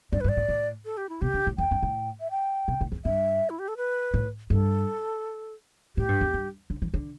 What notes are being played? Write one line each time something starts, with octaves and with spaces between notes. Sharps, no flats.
G2 D5
B4
G2
D5
A2
A2
A4
G4
E4
B2 G4
D3
A2
E2 G5
G2
A2
E5
G5
B2
A2
E2
G2 E5
E4
G4
A4
B4
A2
G2 A4
A2 G4
G2
E2
G2
D3
E3
D3